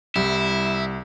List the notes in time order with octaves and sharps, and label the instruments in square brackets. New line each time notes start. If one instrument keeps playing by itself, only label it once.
[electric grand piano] C2 [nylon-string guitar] G3 [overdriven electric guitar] E4